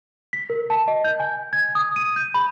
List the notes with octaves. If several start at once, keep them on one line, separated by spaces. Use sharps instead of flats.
B6
A#4
A5
D#5
G6
G#5
G#6
D#6
D#7
G6
B5